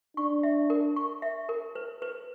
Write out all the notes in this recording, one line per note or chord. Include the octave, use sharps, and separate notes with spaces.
D4 C#6
E5
A#4
C#6
E5
A#4
B4
B4